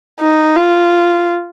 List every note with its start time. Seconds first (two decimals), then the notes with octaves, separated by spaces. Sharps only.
0.20 D#4
0.56 F4